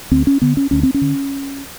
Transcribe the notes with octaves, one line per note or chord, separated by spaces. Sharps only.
D2 C4
C#4
D3 B3
C#4
D2 C#4
C4
C#4
D3